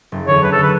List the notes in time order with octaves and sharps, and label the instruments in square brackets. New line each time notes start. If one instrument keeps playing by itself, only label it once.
[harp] F#1
[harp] E2 D3 [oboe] C#5
[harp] F#1 [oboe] B4
[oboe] A4
[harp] D3 [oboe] B4